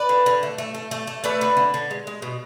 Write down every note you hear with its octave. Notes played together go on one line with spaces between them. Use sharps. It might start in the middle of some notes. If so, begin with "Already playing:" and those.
Already playing: B4 D5
D3
D3
A3
A3
A3
A3
A3
A3 B4 D5
D3
D3
D3
G#3
G#3
B2